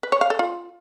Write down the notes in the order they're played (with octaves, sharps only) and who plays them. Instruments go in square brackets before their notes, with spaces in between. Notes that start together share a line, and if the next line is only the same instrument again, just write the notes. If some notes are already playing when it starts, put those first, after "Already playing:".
[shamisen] B4
C#5
F5
A4
F4